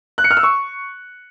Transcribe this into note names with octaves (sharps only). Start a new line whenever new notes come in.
F#6
C#7
F6
E6
C#6